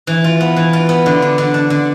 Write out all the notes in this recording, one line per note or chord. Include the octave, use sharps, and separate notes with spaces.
E3
F4
B3
E3
F4
B3
D3
D4
D3
D4
D3